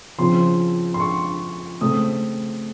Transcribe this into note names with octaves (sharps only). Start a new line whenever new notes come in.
C#3 F3 C4 C6
C6
C#6
C#3 A3 C4 D#6